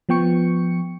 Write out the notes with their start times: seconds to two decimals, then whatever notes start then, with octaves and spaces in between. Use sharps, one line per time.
0.09 F3 B3 G5 C#6 C#7